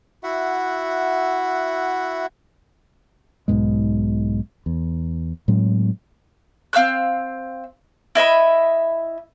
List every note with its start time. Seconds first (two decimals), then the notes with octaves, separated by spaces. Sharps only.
0.23 E4 F#4 E5 F#5
3.48 B1 G#2 B2 G#3
4.66 E2
5.48 A2 F#3 G#3 C4
6.73 C4 F5 E6 F#6
8.15 E4 D#5 E5 B5